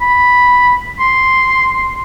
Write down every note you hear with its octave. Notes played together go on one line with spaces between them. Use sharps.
B5
C6